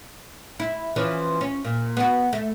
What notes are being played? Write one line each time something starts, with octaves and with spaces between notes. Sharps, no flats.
E4
E3 F3 C#4
C#4
A#2
B3 F#4
A3